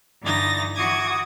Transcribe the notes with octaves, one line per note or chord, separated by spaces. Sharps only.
G2 D3 E3 D#4 A6 A#6
E3 F#4 D6 D#6 G#6